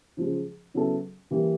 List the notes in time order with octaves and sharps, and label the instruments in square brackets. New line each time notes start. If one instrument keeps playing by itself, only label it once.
[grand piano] C#3 F3 G#3
C#3 F#3 B3 E4 A4
E3 G3 A#3